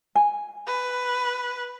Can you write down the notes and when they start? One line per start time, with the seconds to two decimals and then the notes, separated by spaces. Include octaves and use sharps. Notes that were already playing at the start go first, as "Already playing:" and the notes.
0.15 G#5
0.67 B4